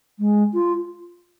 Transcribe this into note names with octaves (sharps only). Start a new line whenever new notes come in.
G#3
F4